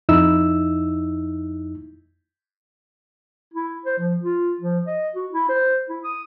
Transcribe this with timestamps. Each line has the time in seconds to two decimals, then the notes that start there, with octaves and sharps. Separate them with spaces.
0.09 F2 D#4 E4 E6
3.54 E4
3.85 C5
3.99 F3
4.23 F4
4.60 F3
4.87 D#5
5.15 F#4
5.32 E4
5.49 C5
5.89 E4
6.04 D#6